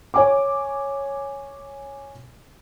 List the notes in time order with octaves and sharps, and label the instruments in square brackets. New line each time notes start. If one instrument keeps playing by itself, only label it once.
[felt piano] C#5 G#5 D6